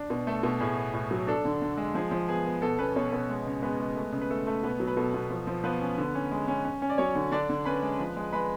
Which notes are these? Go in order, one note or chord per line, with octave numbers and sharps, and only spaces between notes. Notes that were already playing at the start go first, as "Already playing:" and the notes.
Already playing: D4
B2
A3 A4
B2
A2 G#4
B3
A2
F#3
D4 A4
D3
D3
G#3
F3 G#4
F3
B3 G#4
B3
B2 A4
B3 C#4 B4
B2 C#4 C#5
B2
G#3
C#3
G#3 B3 B4
G#3
A3
C#3
B4
A3 A4
A3
B2 B3 B4
F#3
B4
B2 A4
B2
F3
F3
F3 B3 B4
C#4
D3
C#4
G#3
C#4
C#4
C#4
D5
F#3 C#4 C#5
D3
D3 D4 D5
D3
C#4 B4 B5
G#3
F3
G#3
G#3 B4 B5